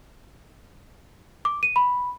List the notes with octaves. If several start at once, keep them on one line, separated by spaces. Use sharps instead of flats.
D6
D#7
B5